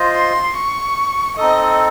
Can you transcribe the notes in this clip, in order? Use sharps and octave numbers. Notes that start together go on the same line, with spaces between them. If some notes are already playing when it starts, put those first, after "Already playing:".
Already playing: F4 C5 D#5
C6
C#6
C4 D#4 A4 D#5